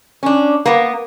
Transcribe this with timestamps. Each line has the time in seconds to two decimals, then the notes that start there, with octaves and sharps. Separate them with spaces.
0.23 C#4 D4
0.66 A#3 B3